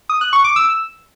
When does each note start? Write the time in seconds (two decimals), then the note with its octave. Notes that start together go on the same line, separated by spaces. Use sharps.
0.09 D#6
0.21 F#6
0.33 C#6
0.44 D6
0.56 E6